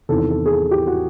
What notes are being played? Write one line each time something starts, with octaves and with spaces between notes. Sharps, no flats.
E2 C3 D#3 A4
A4
G#4
A4
G4
F#4